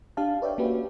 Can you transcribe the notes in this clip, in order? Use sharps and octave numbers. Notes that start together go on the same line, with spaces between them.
D4 G4 F5 A5
B4 C#5 D5 E5 F5 G5
A#3 C#4 F#4 G4 B4